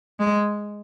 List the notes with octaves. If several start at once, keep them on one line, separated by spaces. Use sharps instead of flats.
G#3